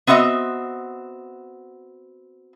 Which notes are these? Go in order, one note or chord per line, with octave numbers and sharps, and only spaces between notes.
B3 C4 F#4 D#5 E5